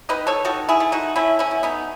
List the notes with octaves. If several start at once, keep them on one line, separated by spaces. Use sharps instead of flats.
D#3 B4 D#5
A4 C#5
D#3 F#4 A4
E4 G#4
A3
D#4 F#4
A3 C#4 E4
C#4 E4
B2
B3 D#4